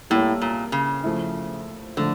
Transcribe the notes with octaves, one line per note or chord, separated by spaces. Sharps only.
A2 G3 A#3 E4 A#4 C#5
A#2
C#3
F3 A3 E4
D3 F3 A3